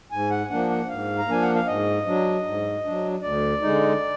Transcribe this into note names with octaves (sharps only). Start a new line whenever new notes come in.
G#2 G#5
F#5
F3 A#3 D4 F#5
F#5
G#2 F5
A#5
F3 A#3 D4 G#5
F#5
F5
G#2 D#5
F#3 D4
G#2
F#3 D4
D2 D5
D3 G#3 D#4